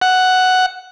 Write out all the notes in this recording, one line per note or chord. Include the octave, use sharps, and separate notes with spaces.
F#5